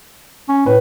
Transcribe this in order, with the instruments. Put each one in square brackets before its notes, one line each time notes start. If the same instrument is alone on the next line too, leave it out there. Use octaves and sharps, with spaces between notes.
[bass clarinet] C#4
[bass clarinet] A2 [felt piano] B4